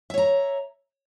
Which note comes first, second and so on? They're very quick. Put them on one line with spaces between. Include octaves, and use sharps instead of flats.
E5 C#5 A#5